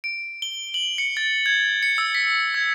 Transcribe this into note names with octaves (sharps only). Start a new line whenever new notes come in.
D7
G7
F#7
C#7
A6
G#6
C#7
E6
B6
G#6